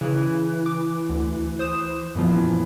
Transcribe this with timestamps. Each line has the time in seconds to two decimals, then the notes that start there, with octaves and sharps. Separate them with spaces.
0.01 C#3 E3
0.66 D6
1.09 D2
1.59 C5 D#6 E7
2.15 F#2 A#2 E3 F3 B3